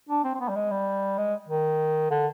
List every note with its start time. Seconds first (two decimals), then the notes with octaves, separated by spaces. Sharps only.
0.09 D4
0.24 C4
0.34 C4
0.40 B3
0.49 G3
0.56 G#3
0.71 G3
1.18 G#3
1.49 D#3
2.11 D3